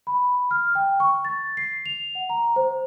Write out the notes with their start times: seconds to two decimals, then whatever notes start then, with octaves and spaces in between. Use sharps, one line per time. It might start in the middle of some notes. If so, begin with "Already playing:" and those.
0.07 B5
0.51 F6
0.75 G5
1.00 C#6
1.25 A6
1.57 C7
1.86 F7
2.15 F#5
2.30 A#5
2.56 C5